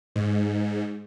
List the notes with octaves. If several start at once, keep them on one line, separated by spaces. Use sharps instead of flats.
G#2